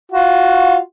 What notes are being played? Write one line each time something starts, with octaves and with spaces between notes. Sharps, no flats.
F4 F#4